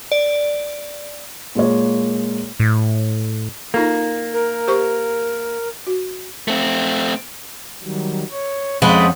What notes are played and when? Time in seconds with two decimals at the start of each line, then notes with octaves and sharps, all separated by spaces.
0.12 D5
1.55 A#2 G#3 A#3 C#5
2.60 A2
3.74 A#3 D#4 F4 A4
3.95 D#4
4.33 A#4
4.68 G4 C5 C#6
5.87 F#4
6.48 A3 C4
7.83 D#3 F#3 G3
8.32 C#5
8.82 F2 G#3 A3 C#4 B4 C5 F#5